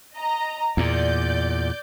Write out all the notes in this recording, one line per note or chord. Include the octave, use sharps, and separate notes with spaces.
D#5 A#5
E2 A#2 D5 G6